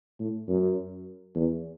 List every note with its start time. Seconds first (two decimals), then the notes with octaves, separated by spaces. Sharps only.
0.20 A2
0.48 F#2
1.36 E2